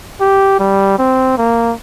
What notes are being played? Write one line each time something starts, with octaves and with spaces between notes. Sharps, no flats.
G4
G3
C4
A#3